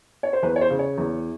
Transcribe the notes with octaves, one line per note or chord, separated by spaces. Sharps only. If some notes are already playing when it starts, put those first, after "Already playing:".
C#5
C5
E2 B4
C#5
C5
C#3
C#5
E2